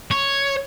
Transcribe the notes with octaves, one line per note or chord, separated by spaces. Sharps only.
C#5